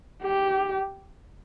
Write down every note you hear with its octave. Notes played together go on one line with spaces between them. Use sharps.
G4